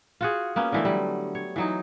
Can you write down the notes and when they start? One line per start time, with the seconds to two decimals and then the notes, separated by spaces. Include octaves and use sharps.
0.21 F4 F#4 G#4
0.56 A#3 B3 C#4
0.72 D3 E3 A3
0.85 F#3 G3
1.35 C#5
1.56 E3 F#3 D#4